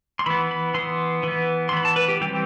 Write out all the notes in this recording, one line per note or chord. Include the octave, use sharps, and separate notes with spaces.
C6
E3 B3 B5
B5
E3 B3 C6
E3 B3
C6
E3 B3 B5
A5
B4
G4
E3 G3 C4 G4